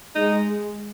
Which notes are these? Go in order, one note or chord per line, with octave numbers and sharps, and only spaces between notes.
G#3 D#4